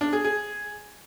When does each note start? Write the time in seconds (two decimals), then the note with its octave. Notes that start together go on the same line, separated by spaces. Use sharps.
0.01 D4
0.13 G#4
0.25 G#4